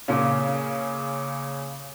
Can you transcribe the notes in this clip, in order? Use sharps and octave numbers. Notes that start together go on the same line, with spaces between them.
A#2 C#3